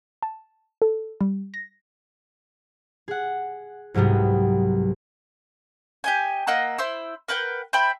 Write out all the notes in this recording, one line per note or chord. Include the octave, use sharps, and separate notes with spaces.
A5
A4
G3
A#6
G#4 F#5
C2 G#2 F#3 G3 B3
G4 D#5 G#5
A#3 D#5 F#5 E6
E4 C5 E6
A#4 B4 F#5 G5
C5 E5 G5 B5